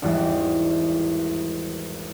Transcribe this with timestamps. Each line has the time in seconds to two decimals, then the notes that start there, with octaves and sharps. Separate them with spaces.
0.02 G#1 E2 E3 G3